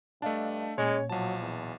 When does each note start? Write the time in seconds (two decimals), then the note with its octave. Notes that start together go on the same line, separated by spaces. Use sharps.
0.22 G2 A3 D4 D#5 F5 A5
0.78 A#2 G#3 C#4 C#5
1.10 B1 F3 F#3 A5
1.42 E2